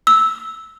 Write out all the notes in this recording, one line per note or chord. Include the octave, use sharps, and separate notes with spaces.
E6